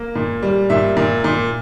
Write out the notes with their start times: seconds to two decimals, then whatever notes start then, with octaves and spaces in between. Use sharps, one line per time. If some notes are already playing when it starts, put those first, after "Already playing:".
Already playing: A#3
0.15 A#2
0.43 G3
0.70 A#2 E5
0.97 A#2
1.24 A#2